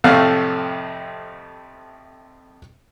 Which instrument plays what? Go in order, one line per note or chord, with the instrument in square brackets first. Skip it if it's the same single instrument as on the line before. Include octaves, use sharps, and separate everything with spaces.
[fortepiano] F2 A2 C3 A3 F5